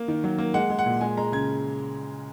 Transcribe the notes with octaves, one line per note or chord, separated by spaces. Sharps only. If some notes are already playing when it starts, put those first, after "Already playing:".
Already playing: A#3
D#3
F#3
A#3
G#3 F#5
G#3
F#5
A#2
G#3 G#5
G#3 A#5
C#3 G#6